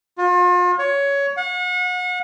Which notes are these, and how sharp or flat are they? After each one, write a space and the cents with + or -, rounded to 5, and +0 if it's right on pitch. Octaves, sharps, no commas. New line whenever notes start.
F4 +40
C#5 +15
F#5 -35